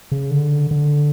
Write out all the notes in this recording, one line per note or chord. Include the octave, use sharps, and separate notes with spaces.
C#3
D3
D3